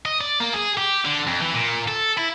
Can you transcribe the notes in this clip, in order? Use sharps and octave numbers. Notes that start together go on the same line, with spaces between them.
D#5
D5
A#3
G#4
G4
D3
F2
E3
A#2
A4
E4